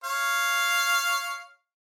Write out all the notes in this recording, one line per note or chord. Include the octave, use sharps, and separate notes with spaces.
C#5 F5